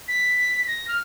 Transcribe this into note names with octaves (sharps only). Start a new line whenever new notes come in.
B6
A#6
F6